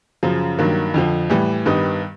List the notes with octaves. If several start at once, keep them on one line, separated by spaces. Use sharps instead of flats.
F#2 C#3 F3
G2 D#3 F#3 A#3
F2 D3 F3
A2 E3 G3
G2 D#3 G3 B3 D#4